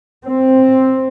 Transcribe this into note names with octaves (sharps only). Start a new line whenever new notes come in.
C4